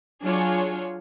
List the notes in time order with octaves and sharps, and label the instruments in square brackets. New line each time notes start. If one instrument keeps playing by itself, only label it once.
[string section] F#3 D4 F4 G#4 C#5